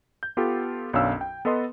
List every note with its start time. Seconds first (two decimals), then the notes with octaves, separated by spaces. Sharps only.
0.23 G6
0.37 B3 F4 G4 A4
0.93 B1 F#2 C#4 D4 F5 E6
1.21 G5
1.45 B3 A4 B4 D#5 C6